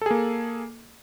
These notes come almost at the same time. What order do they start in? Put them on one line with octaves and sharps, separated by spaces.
A4 G#4 A#3